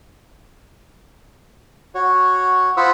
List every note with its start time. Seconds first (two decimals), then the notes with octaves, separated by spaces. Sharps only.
1.95 F#4 C#5
2.77 F4 C5 F#5 B5 D#6 E6